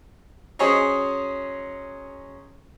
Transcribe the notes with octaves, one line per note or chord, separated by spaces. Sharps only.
F#3 C#4 G#4 C5 C#5 D#5